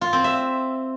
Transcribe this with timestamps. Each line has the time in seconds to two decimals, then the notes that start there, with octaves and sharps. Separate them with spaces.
0.01 F4
0.13 C4
0.24 E5